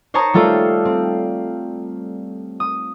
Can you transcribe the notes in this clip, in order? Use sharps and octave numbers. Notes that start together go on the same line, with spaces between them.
C5 C#5 A5 A#5 C#6 D#6
G3 A3 F4 A4
C4
D#6